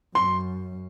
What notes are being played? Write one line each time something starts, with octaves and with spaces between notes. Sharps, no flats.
F#2 C6